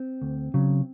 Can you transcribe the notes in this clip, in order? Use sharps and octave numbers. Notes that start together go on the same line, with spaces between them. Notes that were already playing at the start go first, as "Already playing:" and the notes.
Already playing: C4
D2
C#3 F#3